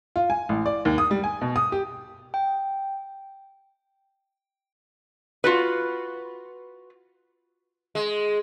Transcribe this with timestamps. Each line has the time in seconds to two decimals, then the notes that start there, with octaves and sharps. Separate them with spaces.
0.16 F4
0.30 G#5
0.49 A1
0.66 D5
0.85 D#2
0.98 D#6
1.11 G3
1.24 G#5
1.41 B2
1.56 D#6
1.72 G4
2.34 G5
5.44 F4 F#4 B4
7.95 G#3